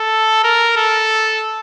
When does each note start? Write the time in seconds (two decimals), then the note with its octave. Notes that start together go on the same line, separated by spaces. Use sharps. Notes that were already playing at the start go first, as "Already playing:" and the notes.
Already playing: A4
0.44 A#4
0.76 A4